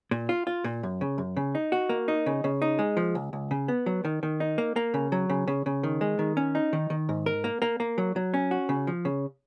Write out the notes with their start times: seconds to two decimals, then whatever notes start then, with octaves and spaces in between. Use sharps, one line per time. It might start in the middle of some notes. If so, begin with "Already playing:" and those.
0.11 A#2
0.29 F4
0.47 F4
0.64 A#2
0.83 F#2
1.01 C#3
1.18 F#2
1.37 C#3
1.55 D#4
1.72 F#4
1.89 A#3
2.08 D#4
2.26 C#3
2.44 C#3
2.62 D#4
2.79 G#3
2.97 F3
3.15 C#2
3.33 C#2
3.51 C#3
3.68 B3
3.86 F#3
4.05 D#3
4.23 D#3
4.40 D#4
4.58 A#3
4.76 A#3
4.94 C#3
5.12 F#3
5.29 C#3
5.48 C#3
5.66 C#3
5.83 D#3
6.01 G#3
6.19 D#3
6.37 C#4
6.55 D#4
6.73 D#3
6.90 D#3
7.09 G#2
7.26 A#4
7.44 A#3
7.62 A#3
7.80 A#3
7.98 F#3
8.16 F#3
8.34 C#4
8.51 F#4
8.69 C#3
8.87 F3
9.05 C#3